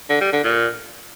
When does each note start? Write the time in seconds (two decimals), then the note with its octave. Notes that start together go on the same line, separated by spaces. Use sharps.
0.09 D3
0.21 G3
0.32 D3
0.44 A#2